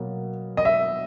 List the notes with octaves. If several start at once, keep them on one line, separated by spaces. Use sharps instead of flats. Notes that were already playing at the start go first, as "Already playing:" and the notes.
Already playing: B2 F#3 A#3
D#5
E5